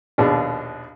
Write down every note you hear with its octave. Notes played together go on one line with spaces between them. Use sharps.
A#1 D#2 B2 D4